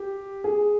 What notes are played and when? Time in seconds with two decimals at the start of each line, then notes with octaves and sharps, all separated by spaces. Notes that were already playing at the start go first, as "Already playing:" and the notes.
Already playing: G4
0.44 G#4